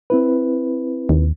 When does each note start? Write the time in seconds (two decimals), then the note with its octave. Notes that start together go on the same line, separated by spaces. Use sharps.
0.10 C4 E4 B4
1.09 D#2